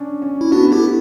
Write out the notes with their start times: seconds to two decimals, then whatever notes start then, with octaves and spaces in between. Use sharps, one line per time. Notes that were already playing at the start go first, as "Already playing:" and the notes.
Already playing: C#4 D4
0.22 C#4
0.41 E4
0.52 B3 D4 F#4
0.72 A3 E4 G4